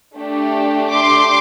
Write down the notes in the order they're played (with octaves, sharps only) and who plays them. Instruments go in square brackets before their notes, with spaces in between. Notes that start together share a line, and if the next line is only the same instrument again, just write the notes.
[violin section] A3 D4 G4
C6 D6